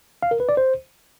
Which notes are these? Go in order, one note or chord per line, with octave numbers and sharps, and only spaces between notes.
F5
A#4
B4
D5
C5